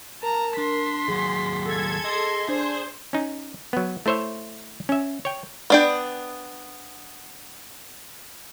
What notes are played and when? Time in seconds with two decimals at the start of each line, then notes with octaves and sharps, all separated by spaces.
0.23 A#4 A5 A#5
0.58 D4 C6 B6
1.08 D#2 F#3 G#4
1.65 A4 G#6
2.05 D#5 C6
2.48 D4 G#4 C5
3.13 C#4 D#4
3.73 F#3 B3
4.06 A3 E4 C5 C#5 E5
4.89 C#4 E5
5.25 C#5 G5
5.70 B3 D4 G5